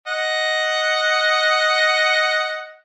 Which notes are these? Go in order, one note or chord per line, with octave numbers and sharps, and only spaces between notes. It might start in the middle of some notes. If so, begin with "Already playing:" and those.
D#5 F#5